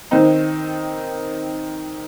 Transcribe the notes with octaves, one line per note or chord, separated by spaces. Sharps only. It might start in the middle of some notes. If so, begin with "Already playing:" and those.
D#3 C4 D#4